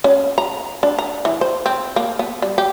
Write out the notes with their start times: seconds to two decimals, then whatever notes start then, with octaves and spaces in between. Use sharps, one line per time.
0.04 C#4
0.38 A#5
0.83 D4
0.99 A#5
1.25 E3
1.41 C5
1.66 C4
1.96 A#3
2.19 B3
2.42 G3
2.58 G4